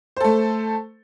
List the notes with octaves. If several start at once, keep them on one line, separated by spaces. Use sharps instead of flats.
A3 A4 C5